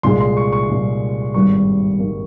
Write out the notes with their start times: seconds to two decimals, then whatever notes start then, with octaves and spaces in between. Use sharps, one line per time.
0.03 C2 A#2 G#3 C6
0.21 C6
0.37 C#6
0.52 C#6
0.69 C2 A#2 G#3
1.34 G#1 G2 D#3 G3 A#3 C#6
2.00 D#3 G3 A#3